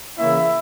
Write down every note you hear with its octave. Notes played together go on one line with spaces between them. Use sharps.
C#3 E3 A#3 C#4 E4 E5